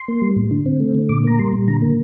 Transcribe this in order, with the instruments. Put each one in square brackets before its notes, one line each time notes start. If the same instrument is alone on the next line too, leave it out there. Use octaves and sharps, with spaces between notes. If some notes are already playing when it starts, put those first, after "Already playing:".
Already playing: [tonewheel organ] C6
A#3
G3
A2
D3
C4
A3
D3
A#2 D6
A#3 A#5
G3 C6
A#2
D3 A#5
A#3